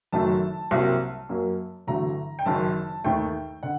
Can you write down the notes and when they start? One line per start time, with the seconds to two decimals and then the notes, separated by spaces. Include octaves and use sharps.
0.12 F#1 F#2 D#3 F#3 A3 A5
0.71 C2 C3 F#3 A#3
1.29 F#2 F#3 A#3
1.87 A1 G2 D3 F#3 A3 A#5
2.39 G5
2.46 F#1 F#2 D#3 A5
3.04 D#2 D#3 A3 G5
3.63 D3 F#5